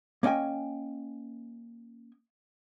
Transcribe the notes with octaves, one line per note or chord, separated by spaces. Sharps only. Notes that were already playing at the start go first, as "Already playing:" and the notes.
A#3 C#4 D#5 G5 G#5